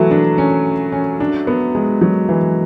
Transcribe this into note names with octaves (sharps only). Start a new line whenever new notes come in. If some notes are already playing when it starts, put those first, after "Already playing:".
Already playing: E3 F#3 A3
D4
C#4
C#4
D4
B3
G#3
F#3
E3